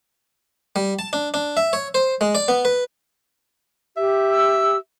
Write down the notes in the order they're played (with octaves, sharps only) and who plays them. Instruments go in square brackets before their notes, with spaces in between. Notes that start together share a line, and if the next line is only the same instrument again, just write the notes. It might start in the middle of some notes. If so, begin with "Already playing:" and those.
[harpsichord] G3
A5
D4
D4
E5
C#5
C5
G#3
D5
B3
B4
[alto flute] G4 [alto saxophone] E5
[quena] E6